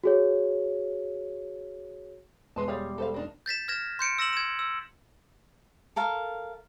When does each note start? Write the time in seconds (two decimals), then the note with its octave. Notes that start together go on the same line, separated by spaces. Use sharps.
0.04 F#4 G#4 C#5
2.56 E1 G#3 B4 A5 C6
2.68 G3 G#4 C#5 F5
2.98 A4 C5 F5
3.14 A#3 D4 D#4
3.46 G6 A6 B6 E7
3.68 F6 G#6 A#6 E7
3.99 C6 G6 C#7 D7
4.19 E6 A#6 E7 F#7
4.33 G#6 E7
4.59 E6
5.96 A4 A#4 F5